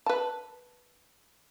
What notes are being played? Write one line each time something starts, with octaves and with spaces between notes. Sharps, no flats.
B4 A5